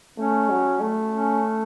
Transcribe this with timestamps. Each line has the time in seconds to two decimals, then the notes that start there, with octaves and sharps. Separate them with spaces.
0.18 A3 C#4
0.49 F#3
0.80 A3
1.11 C#4